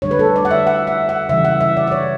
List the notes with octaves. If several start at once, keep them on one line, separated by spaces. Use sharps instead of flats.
D3 G3 C#5
B4
A4
D5
F#5
E5
F#5
E5
F#5
C#3 E3 G3 E5
F#5
E5
D5
D5
C#5